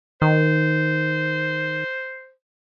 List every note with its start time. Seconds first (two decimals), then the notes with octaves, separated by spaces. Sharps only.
0.22 D#3 C5